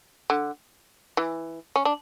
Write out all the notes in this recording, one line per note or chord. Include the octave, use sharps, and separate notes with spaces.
D3
E3
C#4
D4